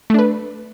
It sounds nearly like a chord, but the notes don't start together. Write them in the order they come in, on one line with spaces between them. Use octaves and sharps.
A3 D4 B4